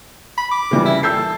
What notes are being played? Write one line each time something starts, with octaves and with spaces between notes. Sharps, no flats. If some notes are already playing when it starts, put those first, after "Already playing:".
B5
D6
C#3 E3 G3
E4
A4 E6 G6 C7